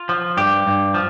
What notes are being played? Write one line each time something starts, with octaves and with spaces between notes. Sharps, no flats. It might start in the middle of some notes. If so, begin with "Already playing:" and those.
Already playing: F4
F3
G2 G4
G2
F3